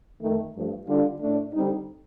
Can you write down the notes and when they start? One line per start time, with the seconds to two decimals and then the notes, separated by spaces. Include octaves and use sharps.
0.21 F2 D#3 A3
0.54 G2 F3 A3
0.87 D3 G3 D4 F4
1.21 A2 A3 D4
1.54 D3 G3 C4 D#4